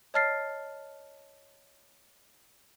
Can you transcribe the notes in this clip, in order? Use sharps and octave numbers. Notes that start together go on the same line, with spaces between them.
C#5 D#5 A5 F6 A6 C7